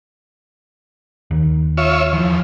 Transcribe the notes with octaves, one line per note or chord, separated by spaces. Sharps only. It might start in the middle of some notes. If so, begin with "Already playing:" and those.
D#2
F4 C#5 E5
E2 F3